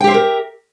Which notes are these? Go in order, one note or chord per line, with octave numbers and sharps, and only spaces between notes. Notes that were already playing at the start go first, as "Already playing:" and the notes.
G4 A#4 C5 E5 G5